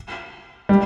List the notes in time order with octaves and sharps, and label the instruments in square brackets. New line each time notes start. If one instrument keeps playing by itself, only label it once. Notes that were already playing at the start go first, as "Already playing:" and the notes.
[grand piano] G3